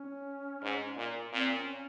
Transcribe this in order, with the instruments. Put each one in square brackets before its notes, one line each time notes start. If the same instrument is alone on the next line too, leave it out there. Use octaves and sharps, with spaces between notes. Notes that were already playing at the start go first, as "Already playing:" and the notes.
Already playing: [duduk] C#4
[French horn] G#2
A#2
[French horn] A#2 [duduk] C4
[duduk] C#4